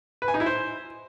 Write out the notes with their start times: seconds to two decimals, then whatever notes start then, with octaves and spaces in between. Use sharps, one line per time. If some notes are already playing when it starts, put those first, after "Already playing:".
0.22 B4
0.28 G#5
0.34 D#4
0.40 E4
0.46 C5